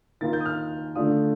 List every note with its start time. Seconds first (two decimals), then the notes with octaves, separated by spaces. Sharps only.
0.21 D#3 A#3 F4 A6
0.33 G6
0.40 D#6
0.46 F6
0.95 D3 A3 D4 F4 D#6